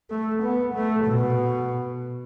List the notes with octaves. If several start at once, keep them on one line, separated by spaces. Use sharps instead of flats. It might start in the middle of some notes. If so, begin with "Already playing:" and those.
A3
B3
A3
B2